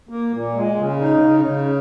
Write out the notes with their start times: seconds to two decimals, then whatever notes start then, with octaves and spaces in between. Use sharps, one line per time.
0.09 A#3
0.32 A#2
0.54 G#3
0.77 C#3
1.00 D#4
1.22 C#3
1.45 C#3